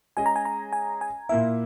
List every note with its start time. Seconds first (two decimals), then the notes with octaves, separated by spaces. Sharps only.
0.17 G#3 C#4 G#4 D#5 G#5
0.26 A#5
0.36 G#5
0.45 A#5
0.73 G#5
1.01 G#5
1.29 A#2 A#3 E4 E5